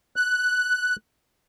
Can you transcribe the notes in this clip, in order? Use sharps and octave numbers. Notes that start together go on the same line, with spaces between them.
F#6